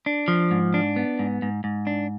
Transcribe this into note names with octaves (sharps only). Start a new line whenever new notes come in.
D4
F3
G#2
D4
B3
G#2
G#2
G#2
D4